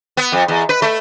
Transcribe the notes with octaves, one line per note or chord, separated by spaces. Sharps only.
B3
F2
E2
B4
A3